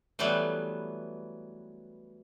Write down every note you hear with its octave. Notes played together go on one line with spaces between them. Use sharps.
E3 F#3 G3 A3 B3